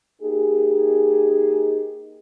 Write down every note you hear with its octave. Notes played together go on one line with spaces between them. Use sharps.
A#3 D#4 G4 G#4